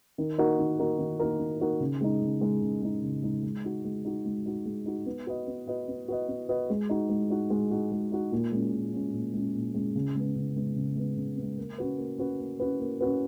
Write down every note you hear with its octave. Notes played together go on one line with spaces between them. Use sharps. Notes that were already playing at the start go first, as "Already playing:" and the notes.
D#3
A#3 D#4 F#4 A#4
D#3
A#3 D#4 F#4 A#4
D#3
A#3 D#4 F#4 A#4
D#3
A#3 D#4 F#4 A#4
C#3
G#3 D#4
C#3
G#3 D#4
C#3
G#3 D#4
C#3
G#3 D#4
G#3
D#4 F#4
G#3
D#4 F#4
G#3
D#4 F#4
G#3
D#4 F#4
B3
F#4 B4 D#5
B3
F#4 B4 D#5
B3
F#4 B4 D#5
B3
F#4 B4 D#5
G#3
D#4 F#4
G#3
D#4 F#4
G#3
D#4 F#4
G#3
D#4 F#4
A#2
G#3 C#4
A#2
G#3 C#4
A#2
G#3 C#4
A#2
G#3 C#4
C#3
G#3 B3
C#3
G#3 B3
C#3
G#3 B3
C#3
G#3 B3
A#3
C#4 F#4 B4
A#3
C#4 F#4 B4
A#3
C#4 F#4 B4
A#3
C#4 F#4 B4